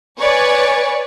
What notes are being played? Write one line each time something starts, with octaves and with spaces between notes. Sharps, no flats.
B4 C#5 D5 G#5 C#6